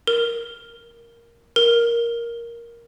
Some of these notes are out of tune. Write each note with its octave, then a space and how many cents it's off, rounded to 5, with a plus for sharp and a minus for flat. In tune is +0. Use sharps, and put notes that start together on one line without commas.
A#4 +0
A#4 +5